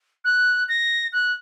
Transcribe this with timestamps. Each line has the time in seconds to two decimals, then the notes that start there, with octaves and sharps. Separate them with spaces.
0.25 F#6
0.69 A#6
1.13 F#6